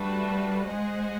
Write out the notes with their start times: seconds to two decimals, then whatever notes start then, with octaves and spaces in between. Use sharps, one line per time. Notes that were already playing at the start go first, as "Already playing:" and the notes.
Already playing: G3 A3 D4 F#4 B4
0.69 G#3 G#4 C5 D#5 F#5